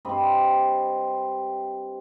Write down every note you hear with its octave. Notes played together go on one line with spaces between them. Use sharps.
G2 C4 D#5 B5